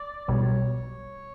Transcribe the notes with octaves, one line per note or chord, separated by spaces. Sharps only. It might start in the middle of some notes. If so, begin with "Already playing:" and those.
Already playing: D5
B1 B2 G3 C#5